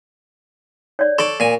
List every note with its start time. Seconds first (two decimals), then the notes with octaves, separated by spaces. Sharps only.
0.99 C#5 D5
1.19 A4 D5 C#6
1.40 A#2 G#5